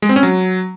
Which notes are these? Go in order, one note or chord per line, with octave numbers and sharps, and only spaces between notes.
G#3
C4
C#4
F#3